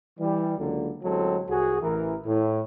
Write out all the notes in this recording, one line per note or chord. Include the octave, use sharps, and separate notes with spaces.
E3 G3
C#2 D3 F#3 A#3
A1 D3 F#3 G#3 C4 A4
C2 F#4 G#4
A1 E3 A#4
A2